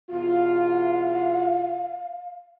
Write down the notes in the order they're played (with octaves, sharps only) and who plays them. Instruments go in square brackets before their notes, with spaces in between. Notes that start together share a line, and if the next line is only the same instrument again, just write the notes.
[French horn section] E2 B2 F4 [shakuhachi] F5